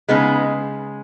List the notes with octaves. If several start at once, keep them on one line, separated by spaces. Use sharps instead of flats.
C#3 G#3 B3 D#4